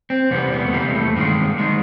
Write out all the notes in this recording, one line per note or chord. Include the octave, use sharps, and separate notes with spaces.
C4
E2 C3 E3 G3 B3
B3
A3
E2 C3 E3 G3 A#3
A3
G2 D#3 G#3 A#3
D#3 G#3